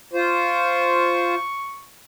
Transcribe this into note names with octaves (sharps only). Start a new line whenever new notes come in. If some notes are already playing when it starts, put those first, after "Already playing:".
F4 C5 C#6